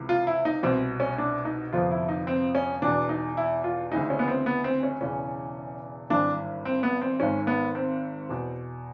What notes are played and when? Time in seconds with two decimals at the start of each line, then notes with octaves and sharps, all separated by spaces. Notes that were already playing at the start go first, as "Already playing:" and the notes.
Already playing: C#2 C3 E3
0.09 F4
0.27 E4
0.45 D#4
0.63 C2 B2 C4
1.00 C#4
1.18 D4
1.45 D#4
1.73 G1 F2 C3 F3 F4
1.91 E4
2.09 D#4
2.27 C4
2.55 C#4
2.82 E1 E2 B2 D4
3.09 D#4
3.37 E4
3.64 F4
3.92 D2 C#3 E3 D#4
4.10 C#4
4.19 B3
4.28 C4
4.46 B3
4.64 C4
4.83 C#4
5.01 E1 E2 C#3 E3 C#4
6.10 G#1 G2 E3 D4
6.65 C4
6.83 B3
7.01 C4
7.20 G#1 G#2 D#3 C#4
7.47 B3
7.75 C4
8.29 E2 B2